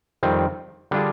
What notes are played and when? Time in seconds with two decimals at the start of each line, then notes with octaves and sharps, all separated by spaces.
0.23 F2 D#3 G3 C4
0.91 D3 G3 D4 F4 G#4